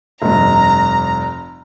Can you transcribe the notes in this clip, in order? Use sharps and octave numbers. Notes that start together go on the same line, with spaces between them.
F1 G2 A#5